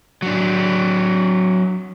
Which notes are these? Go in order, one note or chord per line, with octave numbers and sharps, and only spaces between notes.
F#3 D4